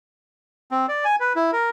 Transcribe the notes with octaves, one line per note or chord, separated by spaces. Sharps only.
C4
D5
G#5
B4
E4
A#4